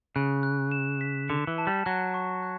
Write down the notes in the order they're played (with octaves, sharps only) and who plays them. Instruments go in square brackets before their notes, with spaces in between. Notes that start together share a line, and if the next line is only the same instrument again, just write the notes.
[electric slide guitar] C#3 [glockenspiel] F#6
[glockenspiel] F#6
E7
B6
[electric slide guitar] D3 [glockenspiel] C#7
[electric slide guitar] E3
[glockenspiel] A5
[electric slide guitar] G3
[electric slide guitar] F#3 [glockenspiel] F#6
[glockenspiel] C#6
F#6